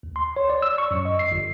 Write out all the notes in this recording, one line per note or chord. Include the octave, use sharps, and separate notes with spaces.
D2
C6
C#5
D5
E6
C#6
F#2
D#5
C7
G1